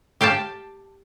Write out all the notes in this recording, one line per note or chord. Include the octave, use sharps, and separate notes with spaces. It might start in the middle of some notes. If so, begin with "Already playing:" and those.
G4 F5 G5 A5